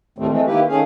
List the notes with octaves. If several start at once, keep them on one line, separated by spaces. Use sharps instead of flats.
D2 A2 D#3 G3 A3 C4
E3 G#3 A3 C4
D#3 A#3 E4 G4 B4
D#3 A3 C#4 G#4 F5